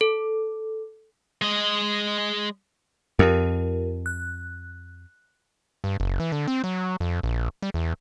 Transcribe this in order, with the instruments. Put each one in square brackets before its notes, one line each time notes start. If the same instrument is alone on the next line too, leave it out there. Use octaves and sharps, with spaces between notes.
[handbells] A4
[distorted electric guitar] G#3 D#5
[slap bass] F2 [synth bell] F4 G4 A#4
[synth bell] F#6
[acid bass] G2
F#1
E3
D3
C4
F#3
F2
A#1
G3
E2